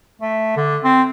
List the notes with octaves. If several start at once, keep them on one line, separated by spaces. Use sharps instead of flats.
A3
D3
C4